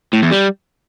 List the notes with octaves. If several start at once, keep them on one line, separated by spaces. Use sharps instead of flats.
A2
E2
G3